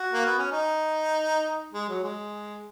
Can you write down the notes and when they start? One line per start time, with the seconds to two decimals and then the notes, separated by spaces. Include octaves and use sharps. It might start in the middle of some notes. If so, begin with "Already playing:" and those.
Already playing: F#4
0.13 A#3
0.26 B3
0.39 C#4
0.52 D#4
1.73 G#3
1.89 F#3
2.03 G#3